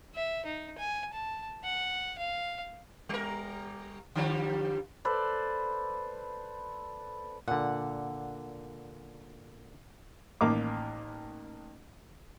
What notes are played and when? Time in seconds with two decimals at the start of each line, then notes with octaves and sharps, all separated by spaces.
0.15 E5
0.45 D#4
0.78 G#5
1.13 A5
1.64 F#5
2.18 F5
3.09 G3 A#4
4.15 D3 F3 G3
5.05 A4 B4 C5 D5
7.48 A#2 D3 F#5
10.41 A1 D#3 A#3 D6